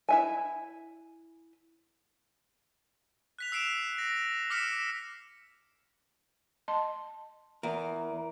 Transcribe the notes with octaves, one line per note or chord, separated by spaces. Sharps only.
E4 E5 G#5
F#6 B6 F7
E6 C7 D7 E7
A#6
D6 F6 B6 C#7 E7
D#5 A5 C6
E2 A#4